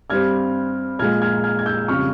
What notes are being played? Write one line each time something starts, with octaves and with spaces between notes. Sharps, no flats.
G2 G3 C4 F6 G#6
A#1 A#2 G#3 F6 G#6
F6 G#6
F6 G#6
G#6
E6 G6
F2 C#3 G3 C#6 F6